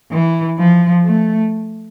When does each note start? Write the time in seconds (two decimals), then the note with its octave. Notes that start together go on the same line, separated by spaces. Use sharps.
0.11 E3
0.58 F3
1.05 A3